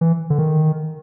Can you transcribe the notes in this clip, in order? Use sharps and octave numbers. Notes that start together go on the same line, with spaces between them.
E3
D3
D#3